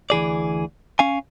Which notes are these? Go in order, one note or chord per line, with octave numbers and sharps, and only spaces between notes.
D2 E3 G#4 D5
C#4 F5 G#5